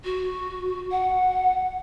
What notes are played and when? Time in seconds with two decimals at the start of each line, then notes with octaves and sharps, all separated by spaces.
0.05 F#4
0.91 F#5